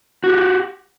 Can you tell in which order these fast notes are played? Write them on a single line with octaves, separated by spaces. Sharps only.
F#4 G4 F#5